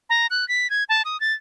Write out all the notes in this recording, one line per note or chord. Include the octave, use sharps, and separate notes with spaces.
A#5
F#6
B6
G#6
A5
D#6
A6